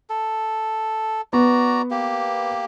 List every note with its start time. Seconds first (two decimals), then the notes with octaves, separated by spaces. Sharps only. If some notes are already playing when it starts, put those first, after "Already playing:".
0.10 A4
1.33 B3 F#4 D5 A#5
1.91 A#3 G4